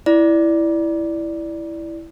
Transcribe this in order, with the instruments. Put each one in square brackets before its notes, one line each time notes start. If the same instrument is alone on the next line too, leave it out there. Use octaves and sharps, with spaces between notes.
[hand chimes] E4 D5